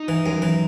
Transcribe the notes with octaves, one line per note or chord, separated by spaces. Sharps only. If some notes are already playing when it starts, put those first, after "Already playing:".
Already playing: D#4
E3
F#2
E3